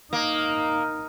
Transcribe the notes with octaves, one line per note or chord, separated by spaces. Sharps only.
A#3 D#4